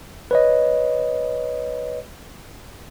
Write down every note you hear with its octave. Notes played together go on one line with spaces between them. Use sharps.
B4 C#5 D#5